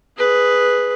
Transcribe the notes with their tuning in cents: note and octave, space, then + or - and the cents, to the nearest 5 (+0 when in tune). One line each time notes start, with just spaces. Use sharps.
G#4 +0 B4 +0